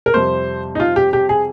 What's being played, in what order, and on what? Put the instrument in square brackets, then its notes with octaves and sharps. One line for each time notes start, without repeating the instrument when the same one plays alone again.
[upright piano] A#4
F2 C3 G3 C5
D#4
F4
G4
G4
G#4